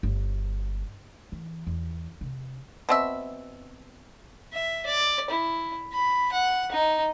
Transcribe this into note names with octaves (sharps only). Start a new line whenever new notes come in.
G1
E3
E2
C3
B2 C4 E5
E5
D5
E4
B5
F#5
D#4